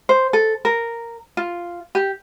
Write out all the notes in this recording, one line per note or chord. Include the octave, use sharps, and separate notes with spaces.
C5
A4
A#4
F4
G4